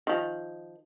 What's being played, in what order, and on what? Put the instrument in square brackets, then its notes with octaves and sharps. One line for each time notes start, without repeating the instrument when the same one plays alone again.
[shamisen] D#3 F3